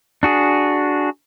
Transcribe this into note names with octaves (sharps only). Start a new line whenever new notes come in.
D4 F#4 G#4